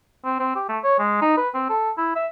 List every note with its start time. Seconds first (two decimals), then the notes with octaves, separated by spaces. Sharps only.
0.24 C4
0.39 C4
0.56 G4
0.69 A3
0.84 C#5
0.99 G#3
1.22 D#4
1.37 B4
1.54 C4
1.69 A4
1.97 E4
2.16 E5